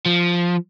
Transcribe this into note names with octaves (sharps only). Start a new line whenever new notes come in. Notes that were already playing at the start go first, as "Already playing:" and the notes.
F3